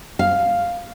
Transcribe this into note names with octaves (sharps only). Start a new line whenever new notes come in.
F5